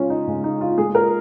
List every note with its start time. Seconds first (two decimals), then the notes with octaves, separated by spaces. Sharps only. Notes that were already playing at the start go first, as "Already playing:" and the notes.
Already playing: C#3 G#3 C#4 F4
0.10 D#4
0.27 C#3 G#3
0.44 D#4
0.61 F4
0.78 A#2 G#3 G#4
0.95 A#4